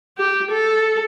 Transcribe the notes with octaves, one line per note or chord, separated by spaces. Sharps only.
G4
A4